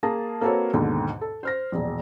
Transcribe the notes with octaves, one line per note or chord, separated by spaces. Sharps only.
A#3 G#4 A5 A#6
A#3 C4 F#4 A4 B4 C#5
D#2 G#2 B2 D3
A4
C5 F6 A#6
E1 A#1